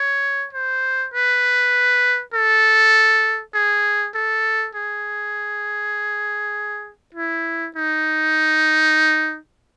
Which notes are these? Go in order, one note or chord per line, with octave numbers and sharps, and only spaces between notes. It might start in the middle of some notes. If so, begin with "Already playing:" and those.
Already playing: C#5
C5
B4
A4
G#4
A4
G#4
E4
D#4